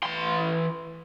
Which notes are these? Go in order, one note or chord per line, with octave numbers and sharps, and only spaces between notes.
E3 C6